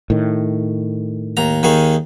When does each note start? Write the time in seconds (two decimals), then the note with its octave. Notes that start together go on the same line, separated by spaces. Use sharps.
0.10 A2 D#3
1.37 D#2 A#5
1.63 D#2 D#3 G#4